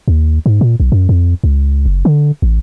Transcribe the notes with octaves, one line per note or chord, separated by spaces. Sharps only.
D#2
G#2
A#2
B1
F#2
F2
C#2
F#1
D3
A1